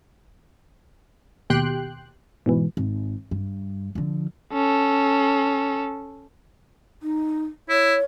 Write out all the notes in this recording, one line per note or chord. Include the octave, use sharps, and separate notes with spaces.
D#2 B2 G4 G5 C6 F#6
G#2 B2 E3
G#1
G2
D3 F3
C#4 A4
D#4
E4 C#5